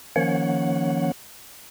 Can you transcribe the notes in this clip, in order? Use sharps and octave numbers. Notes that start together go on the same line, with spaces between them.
D#3 F3 A#3 C#4 C#5 F#5